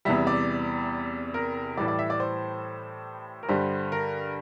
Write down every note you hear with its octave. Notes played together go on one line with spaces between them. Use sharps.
E2 C3 E3 G3 E5
D5
A#4
A2 E3 G3 D5
D5
E5
D5
C5
A#4
G2 D3 G3 C5
A#4